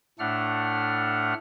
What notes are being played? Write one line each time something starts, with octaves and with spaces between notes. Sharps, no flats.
A2 A3 D4 F#5 F6